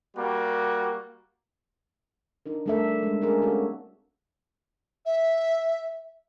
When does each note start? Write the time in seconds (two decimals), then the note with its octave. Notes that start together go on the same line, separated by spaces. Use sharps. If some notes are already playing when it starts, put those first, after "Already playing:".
0.15 G3 A#3 F#4
2.46 D4 D#4 A#4
2.66 G3 A3 D4 A4 A#4 E5
3.03 G3 G#3 D4
3.21 A#3 C#4 D4 G#4 A#4
3.42 C4 C#4 F#4 A4
5.06 E5